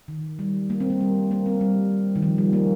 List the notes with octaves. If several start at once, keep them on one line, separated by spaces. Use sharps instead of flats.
D#3
G3
A#3
C4
A#3
G3
A#3
C4
G3
D#3
F3
G3
A#3